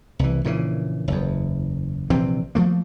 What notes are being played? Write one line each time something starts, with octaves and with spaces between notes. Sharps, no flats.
C2 E3
A#1 A#2 C#3 E3
F#1 E2
A#1 C3 E3 C4
F3 A3 A#3